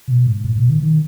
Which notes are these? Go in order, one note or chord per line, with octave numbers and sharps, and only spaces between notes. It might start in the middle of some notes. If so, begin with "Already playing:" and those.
B2
G#2
A2
B2
D#3
D#3